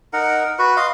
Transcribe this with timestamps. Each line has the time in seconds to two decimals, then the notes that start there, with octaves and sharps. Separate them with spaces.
0.13 D#4 A#4 F#5
0.59 F#4 B4
0.77 D#5 F5 C6